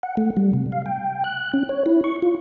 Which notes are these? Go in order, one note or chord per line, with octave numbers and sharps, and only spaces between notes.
F#5
A3
G3
C3
F5
G5
F#6
C#4
C#5
E4
C#6
F4